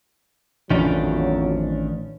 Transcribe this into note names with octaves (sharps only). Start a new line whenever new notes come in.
A1 F2 D#3 F#3 C#4 D4